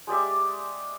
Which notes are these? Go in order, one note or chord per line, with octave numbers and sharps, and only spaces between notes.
G#3 G4 D5 E5